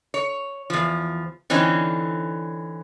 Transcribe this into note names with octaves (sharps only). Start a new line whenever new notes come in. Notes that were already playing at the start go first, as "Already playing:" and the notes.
C#5
E2 F3
D3 E3 C4 C#4 D#4